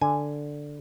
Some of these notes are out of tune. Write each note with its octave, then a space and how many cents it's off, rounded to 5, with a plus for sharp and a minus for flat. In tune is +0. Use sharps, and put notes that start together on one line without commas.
D3 +0 G#5 +0